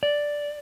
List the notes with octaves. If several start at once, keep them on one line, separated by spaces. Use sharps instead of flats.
D5